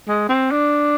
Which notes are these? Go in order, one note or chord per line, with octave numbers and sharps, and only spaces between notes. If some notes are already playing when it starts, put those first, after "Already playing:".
G#3
C4
D4